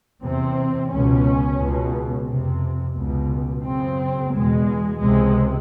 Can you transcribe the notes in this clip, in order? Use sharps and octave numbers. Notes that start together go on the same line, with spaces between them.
E2 C3 C4
C#2 B2 C#4
C#2 B2
F2 C3
C#2 B2
F#2 C#3 C4
E2 B2 G#3
C#2 C3 G#3